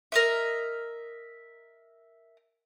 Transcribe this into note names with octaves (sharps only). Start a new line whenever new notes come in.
A#4 D#5 E5